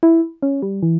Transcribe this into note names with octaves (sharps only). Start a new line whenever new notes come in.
E4
C#4
G3
E3